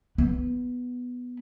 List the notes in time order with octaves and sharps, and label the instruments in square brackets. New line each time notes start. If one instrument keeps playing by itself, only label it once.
[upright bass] B3